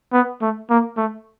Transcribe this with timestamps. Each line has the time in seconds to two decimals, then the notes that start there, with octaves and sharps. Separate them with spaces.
0.13 B3
0.41 A3
0.70 A#3
0.97 A3